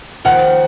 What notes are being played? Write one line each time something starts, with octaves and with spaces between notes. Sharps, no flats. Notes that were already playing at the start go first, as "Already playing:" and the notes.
D#3 F3 F#5